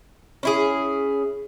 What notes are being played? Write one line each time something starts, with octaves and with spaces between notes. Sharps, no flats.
C#4 E4 G#4